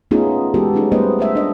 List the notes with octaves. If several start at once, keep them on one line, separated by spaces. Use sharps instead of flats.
A3 B3 C#4 D#4 F4 G#4
E3 G#3 B3 F#4 G4 A4
G3 A3 C#4 D#4 G#4
G3 A3 B3 B4 C5 D#5
A3 C5 E5
D4 D#5